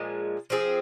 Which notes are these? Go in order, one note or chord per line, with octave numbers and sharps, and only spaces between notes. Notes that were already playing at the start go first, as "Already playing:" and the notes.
Already playing: A#2 F3 G#3
F3 C4 G#4